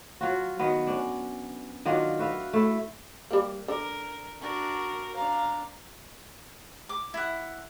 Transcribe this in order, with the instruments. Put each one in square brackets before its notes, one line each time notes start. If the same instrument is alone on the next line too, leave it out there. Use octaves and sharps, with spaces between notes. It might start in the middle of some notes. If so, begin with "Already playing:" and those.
[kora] F#3 F4 F#4
D#3 F#3 B3
C#4 D4
D#3 F#3 D4 F4
F#4 B4 E5 F5
A3 E4
[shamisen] G3 A#3
[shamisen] D3 [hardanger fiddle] A#4
[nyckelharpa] D4 [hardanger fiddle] F#4 A#4
[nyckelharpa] D4 A#5 [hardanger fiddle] F5
[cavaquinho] D6
E4 F#5